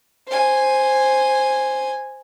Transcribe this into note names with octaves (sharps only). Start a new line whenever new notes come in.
C5 G#5